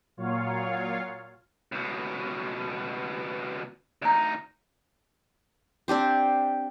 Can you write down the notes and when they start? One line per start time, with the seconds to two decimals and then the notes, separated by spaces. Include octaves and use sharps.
0.17 A#2 F#3 F4 C#5 F5
1.72 C#2 B2
4.02 D2 D#4 D5 A#5
5.88 C4 D4 G4 C5